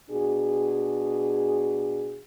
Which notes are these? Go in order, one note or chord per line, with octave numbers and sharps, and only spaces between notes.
B2 D4 F#4 G#4